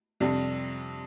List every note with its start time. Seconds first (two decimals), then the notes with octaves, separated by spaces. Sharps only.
0.20 F2 C3 G3 D4